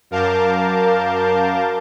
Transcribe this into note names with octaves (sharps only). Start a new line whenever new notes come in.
F#2 A#4 F5 A5 D6 G6